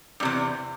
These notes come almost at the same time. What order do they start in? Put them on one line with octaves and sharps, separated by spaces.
G2 C3 E2